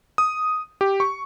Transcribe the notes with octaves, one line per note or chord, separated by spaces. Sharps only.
D#6
G4
C#6